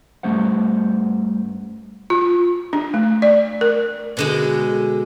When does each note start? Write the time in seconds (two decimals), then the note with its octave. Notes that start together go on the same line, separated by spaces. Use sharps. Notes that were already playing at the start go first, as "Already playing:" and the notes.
0.23 G2 G3 A3 C#4 C5 F#5
2.10 F4
2.73 D4
2.94 A3
3.22 D5
3.61 A#4
4.17 B2 D3 G#3